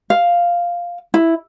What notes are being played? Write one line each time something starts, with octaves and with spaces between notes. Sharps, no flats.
F5
E4